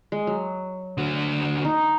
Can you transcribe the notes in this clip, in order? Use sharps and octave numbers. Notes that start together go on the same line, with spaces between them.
G#3
F#3
D3 F#4
D#4